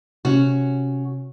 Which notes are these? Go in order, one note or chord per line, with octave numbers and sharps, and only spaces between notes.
C3 C#4 F#4